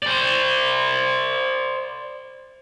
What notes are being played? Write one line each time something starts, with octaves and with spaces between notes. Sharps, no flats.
C5 D5